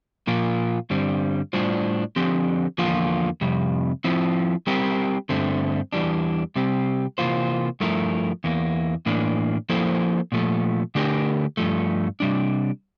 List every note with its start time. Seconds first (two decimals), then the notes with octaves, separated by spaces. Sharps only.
0.27 A#2 F3 A#3 F4 A#4
0.90 G2 D3 G3 C4
1.53 A2 G3 D4 F4 C5
2.16 D3 F3 C4 G4
2.78 E2 D3 F3 A#3 F4
3.41 F2 C3 G3
4.04 F3 C4 E4
4.67 G3 C4 G4 A#4
5.29 G2 D3 A3 C4
5.93 E2 E3 G3 D4
6.56 C3 G3 C4 G4
7.18 C3 E3 A#3 F4 C5
7.80 G2 F3 A3 E4 A#4
8.44 E2 E3 A#3
9.06 A2 E3 A#3 D4
9.69 F3 A#3 E4 A4 C5
10.32 A#2 F3 A3
10.95 D3 A3 D4 G4 A#4
11.57 G2 F3 A3
12.20 C3 G3 D4